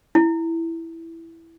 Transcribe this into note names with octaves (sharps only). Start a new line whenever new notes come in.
E4